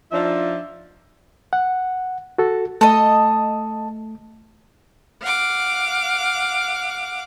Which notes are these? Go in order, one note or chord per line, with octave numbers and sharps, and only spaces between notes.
F3 D4 D#4 F4 E5
F#5
F#4 A4
A3 A4 D#5
F5 F#5 D6